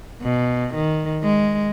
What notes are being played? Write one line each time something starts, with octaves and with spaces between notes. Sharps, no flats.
B2
D#3
G#3